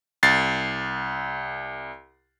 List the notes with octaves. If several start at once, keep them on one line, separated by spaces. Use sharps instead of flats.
C2 A6 C7